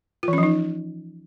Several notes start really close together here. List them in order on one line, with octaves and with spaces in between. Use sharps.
F4 E3 C#4 F3 D#4